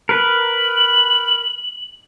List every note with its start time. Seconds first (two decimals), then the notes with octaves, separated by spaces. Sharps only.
0.09 A#4 B4 F#7